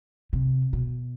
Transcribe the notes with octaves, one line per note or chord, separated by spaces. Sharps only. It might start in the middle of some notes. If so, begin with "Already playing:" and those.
C3
B2